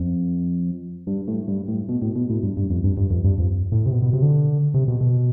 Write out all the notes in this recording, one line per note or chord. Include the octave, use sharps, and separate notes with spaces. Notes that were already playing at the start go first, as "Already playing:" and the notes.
Already playing: F2
G2
A2
G2
A2
B2
A2
B2
A2
G2
G2
F2
G2
G2
F2
G2
F2
A2
C3
B2
B2
C3
D3
C3
B2
B2